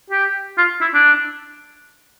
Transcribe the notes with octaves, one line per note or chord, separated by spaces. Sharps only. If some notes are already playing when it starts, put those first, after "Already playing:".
G4
F4
E4
D4